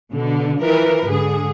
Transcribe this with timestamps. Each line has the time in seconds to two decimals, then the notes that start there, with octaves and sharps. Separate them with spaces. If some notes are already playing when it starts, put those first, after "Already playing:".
0.11 B2 D3
0.60 E3 F3 A#4 B4
1.08 G#2 D3 G#4